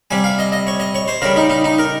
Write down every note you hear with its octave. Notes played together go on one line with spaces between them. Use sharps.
C3 G3 G#5
F5
D#5
D#5
C#5
D#5
C#5
C5
C#3 G3 A#4
D#4
D#4
D#4
A#4